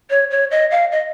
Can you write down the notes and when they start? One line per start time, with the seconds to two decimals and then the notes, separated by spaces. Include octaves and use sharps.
0.10 C#5
0.31 C#5
0.51 D#5
0.71 F5
0.92 D#5